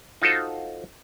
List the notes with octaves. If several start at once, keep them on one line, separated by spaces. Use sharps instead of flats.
D#4 F4 F#4 A4 C5